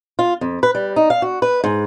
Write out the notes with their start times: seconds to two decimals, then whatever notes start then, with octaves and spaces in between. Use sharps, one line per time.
0.19 F4
0.41 F2
0.63 B4
0.75 G3
0.96 D#4
1.10 F5
1.22 F#4
1.42 B4
1.64 G#2